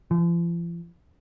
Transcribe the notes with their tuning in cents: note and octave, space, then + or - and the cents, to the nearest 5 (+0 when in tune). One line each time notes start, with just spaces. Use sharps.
F3 -45